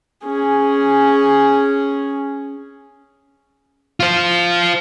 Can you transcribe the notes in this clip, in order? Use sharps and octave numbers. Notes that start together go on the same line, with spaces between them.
C#4 G#4
F4 C5